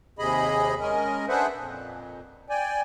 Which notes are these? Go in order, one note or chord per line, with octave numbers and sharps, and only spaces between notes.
D#2 C3 G#4 D#5 B5
G#3 C#4 A#4 D#5
D4 G#4 B4 C5 E5 F#5
F2 A#2
D5 G5 G#5